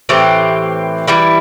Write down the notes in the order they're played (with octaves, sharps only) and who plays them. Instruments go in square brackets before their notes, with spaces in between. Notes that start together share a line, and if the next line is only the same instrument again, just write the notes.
[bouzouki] A2 E3 C4 G4
E3 G3 E4